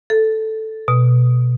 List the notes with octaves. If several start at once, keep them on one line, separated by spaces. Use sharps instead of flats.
A4
B2